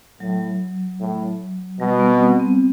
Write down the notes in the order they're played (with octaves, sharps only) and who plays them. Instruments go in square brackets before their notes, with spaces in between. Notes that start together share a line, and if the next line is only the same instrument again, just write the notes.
[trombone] A2 [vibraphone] F#3
[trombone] A2
[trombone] B2 [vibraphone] G3
[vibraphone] B3
C4
B3
C4